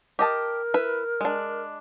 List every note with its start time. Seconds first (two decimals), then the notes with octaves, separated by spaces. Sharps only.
0.19 G4 A#4 D#5 A5
0.74 E4 B4
1.21 G#3 D4